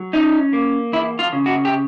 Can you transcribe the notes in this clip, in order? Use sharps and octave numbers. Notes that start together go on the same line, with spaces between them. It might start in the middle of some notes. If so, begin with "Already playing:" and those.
Already playing: F#3
C#4 D#4
A#3
E2 E4
F4
C#3
F#4
G4